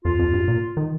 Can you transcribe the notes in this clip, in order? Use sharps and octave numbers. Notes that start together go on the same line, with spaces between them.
F2 F4
F2
G2
A#2
D#3